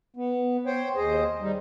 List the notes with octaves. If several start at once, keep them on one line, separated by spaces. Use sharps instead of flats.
B3
C5 C#5 G5
D#2 G#4 C5 D#5
G3 D#4